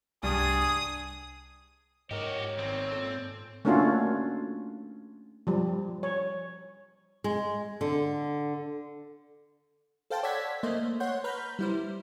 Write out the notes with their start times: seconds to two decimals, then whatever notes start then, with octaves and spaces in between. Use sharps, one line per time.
0.23 C2 G2 D4 G#4 D#6
2.11 G#2 F#4 G4 A#4 C#5 D#5
2.58 G#1 C4
2.91 A#2 A4 A5
3.65 A3 A#3 C#4 D4 F4 F#4
5.47 F3 G3
6.03 C#5
7.24 G#3
7.81 D3
10.10 A4 C5 F5 G5 A5
10.23 C#5 D5 F#5 E6 G#6 B6
10.63 A3 A#3 C5 D#5
11.00 C#5 F#5 C6 G6
11.24 B4 A#5 B5 F6 G6
11.59 G3 E4 C5